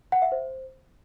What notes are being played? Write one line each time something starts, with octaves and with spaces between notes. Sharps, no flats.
F#5
E5
C5